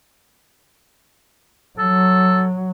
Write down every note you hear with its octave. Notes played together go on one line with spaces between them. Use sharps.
F#3 A4